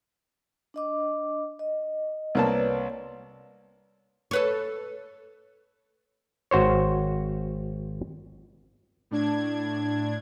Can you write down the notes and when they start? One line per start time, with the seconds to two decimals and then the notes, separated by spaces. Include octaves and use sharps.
0.74 D4 D#5 D6
1.59 D#5
2.35 C2 A#3 B4 C#5 D5 A5
4.31 A4 B4 C#5
6.51 G#1 F#4 C5 C#5
9.11 A2 D4 G#6